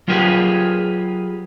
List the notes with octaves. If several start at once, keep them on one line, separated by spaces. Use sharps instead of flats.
F#3 F4 G4 G#4 A#4 B4